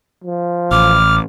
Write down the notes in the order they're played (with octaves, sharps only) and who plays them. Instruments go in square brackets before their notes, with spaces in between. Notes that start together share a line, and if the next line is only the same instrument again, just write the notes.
[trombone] F3
[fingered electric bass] A1 [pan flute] D6 [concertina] F6